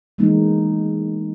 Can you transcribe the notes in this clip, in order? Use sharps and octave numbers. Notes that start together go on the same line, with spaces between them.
E3 G#3 A#3 B3 D#4